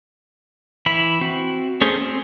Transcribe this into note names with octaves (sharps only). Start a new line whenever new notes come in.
E3 E4 B5
C4 F#4
A3 C#4 G#4 C5
C4